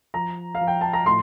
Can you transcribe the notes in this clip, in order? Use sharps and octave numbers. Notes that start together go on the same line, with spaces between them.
F3 A#5
F5
F3
G5
A5
A#5
A2 C6